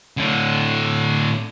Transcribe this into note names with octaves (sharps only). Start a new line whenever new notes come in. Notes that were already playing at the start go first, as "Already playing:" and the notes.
A2 D3